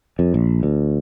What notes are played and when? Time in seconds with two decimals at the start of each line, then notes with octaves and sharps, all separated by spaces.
0.19 F2
0.34 A#1
0.63 D2